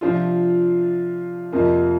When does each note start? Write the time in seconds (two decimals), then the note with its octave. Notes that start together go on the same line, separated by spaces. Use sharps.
0.01 C3 F3 D4 F4
1.52 F2 C3 F3 A#3